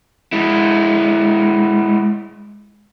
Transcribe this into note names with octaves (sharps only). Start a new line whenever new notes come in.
G#3 E4